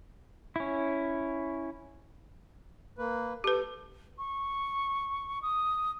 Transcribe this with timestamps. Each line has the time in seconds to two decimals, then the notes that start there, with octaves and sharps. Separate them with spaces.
0.56 C#4 E4
2.98 A#3 B4
3.44 G4 A4 B4
4.18 C#6
5.42 D#6